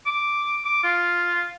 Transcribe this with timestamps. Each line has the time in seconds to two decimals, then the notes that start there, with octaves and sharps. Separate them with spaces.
0.06 D6
0.65 D6
0.83 F4